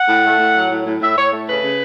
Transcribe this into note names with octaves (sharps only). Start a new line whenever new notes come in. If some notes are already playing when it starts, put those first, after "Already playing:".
Already playing: F#5
A2
A3
A2
F#3
A2
A2
A2 E5
A2 C#5
A3
C#3 B4
C#3